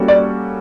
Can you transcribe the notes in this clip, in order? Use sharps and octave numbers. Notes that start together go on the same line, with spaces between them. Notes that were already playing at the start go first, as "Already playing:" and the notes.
Already playing: G3 A#3 C#4 F#4 A4
D5